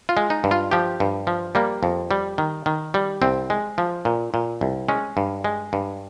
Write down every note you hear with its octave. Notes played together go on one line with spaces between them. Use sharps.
F4
G#3
D#4
G2
F4
F3 G4
G2
F3
G3 A#3
F2
G3
D#3
D#3
G3
C2 C4
G#3
F3
A#2
A#2
C2
G#3 C#4
G2
G#3
G2